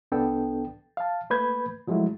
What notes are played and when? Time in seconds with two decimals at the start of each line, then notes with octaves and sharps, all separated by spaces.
0.12 C2 B3 D4 A4 G5
0.97 F5 A5
1.30 A3 A#3 B4 B5 G6 G#6
1.87 F3 F#3 G#3 A3 E4 F#4